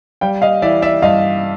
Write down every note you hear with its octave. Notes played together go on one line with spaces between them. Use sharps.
G3 F5 G5
D#5 F5
E3 D5 E5
D5 E5
G2 D#5 F5